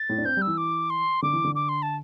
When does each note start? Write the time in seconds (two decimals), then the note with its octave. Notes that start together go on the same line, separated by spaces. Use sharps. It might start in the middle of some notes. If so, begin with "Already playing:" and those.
Already playing: A6
0.09 A2
0.18 D4
0.25 C4 G6
0.37 G3
0.42 E6
0.47 E3
0.58 D6
0.90 C6
1.22 D3 D6
1.33 E3
1.44 D3
1.55 D6
1.69 C6
1.82 A5